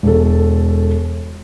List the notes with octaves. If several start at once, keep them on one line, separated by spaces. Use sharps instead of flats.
E1 A4